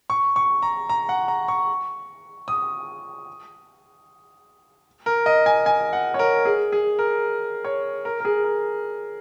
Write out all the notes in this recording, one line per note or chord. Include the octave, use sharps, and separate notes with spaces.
C#6
C#6
A#5
A#5
F#5
A#5
C#6
D#6
A#4
D#5
G#5
G#5
F#5
C#5
A#4
G#4
G#4
A#4
C#5
A#4
A#4
G#4
A#4